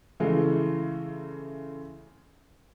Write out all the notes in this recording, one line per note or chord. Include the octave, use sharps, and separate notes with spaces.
C#3 E3 G#3 A3